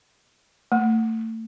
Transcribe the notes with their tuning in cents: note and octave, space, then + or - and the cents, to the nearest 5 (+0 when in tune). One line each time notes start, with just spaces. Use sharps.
A3 +30